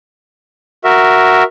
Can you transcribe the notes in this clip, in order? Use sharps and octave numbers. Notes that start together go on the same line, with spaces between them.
F#4 A#4 E5